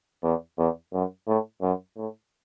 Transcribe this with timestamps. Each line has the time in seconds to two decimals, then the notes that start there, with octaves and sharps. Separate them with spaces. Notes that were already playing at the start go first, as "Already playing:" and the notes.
0.23 E2
0.58 E2
0.93 F#2
1.27 A2
1.62 F#2
1.96 A2